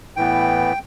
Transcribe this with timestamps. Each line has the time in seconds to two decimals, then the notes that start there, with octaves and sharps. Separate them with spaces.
0.16 A2 E3 B3 G5